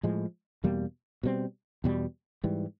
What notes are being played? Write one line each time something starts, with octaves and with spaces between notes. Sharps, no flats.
A2 F3 G#3
E2 B2 G3 A#3
B2 G3 C4
E2 B2 G3
G#2 E3 G3